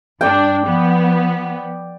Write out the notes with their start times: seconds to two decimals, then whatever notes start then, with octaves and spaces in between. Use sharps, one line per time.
0.21 G2 D4 D5 G5
0.66 F3 B3